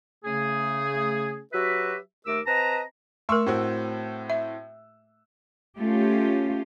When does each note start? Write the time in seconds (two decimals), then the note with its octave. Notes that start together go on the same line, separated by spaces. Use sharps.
0.25 C#3 A3 G#4
1.52 F#3 F#4 G4 B4 E5
2.26 D#2 A3 A#4 D6 E6
2.46 C4 B4 D#5 A5 A#5
3.29 A3 A#4 C6 C#6 E6
3.46 A2 C4 F#4
4.30 E5
5.79 A3 C#4 F4 G4